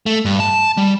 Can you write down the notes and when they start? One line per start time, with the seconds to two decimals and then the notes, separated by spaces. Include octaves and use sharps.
0.06 A3
0.25 G2
0.40 A5
0.77 G3